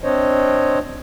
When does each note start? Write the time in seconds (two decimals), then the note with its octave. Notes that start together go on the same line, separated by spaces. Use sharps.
0.04 C4 D4 C5 C#5 D#5